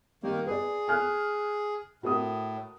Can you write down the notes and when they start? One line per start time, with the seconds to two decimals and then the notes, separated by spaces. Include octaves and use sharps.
0.23 D#3 G3 A#3
0.47 G#4 B4 D5
0.88 G#5 F6 F#6
2.03 A2 F#4 A#4 D#6